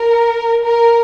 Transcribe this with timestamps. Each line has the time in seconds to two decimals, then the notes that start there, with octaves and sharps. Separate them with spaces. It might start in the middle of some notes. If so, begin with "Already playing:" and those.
Already playing: A#4
0.64 A#4